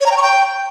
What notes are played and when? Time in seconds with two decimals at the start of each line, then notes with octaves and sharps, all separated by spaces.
0.01 C#5
0.06 A#5
0.11 G5
0.17 C#6
0.22 G5